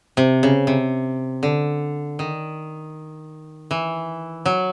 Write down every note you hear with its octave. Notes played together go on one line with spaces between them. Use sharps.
C3
C#3
C3
D3
D#3
E3
F#3